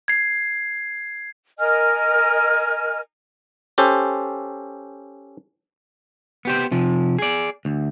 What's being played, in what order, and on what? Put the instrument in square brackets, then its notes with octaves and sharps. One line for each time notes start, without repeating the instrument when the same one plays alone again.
[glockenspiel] G#6 C7
[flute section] A#4 D#5 G#5 F6
[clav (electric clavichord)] C#4 G4 A4 C5
[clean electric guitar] B3 G4 C5
C3 F3
G#4 D5
D2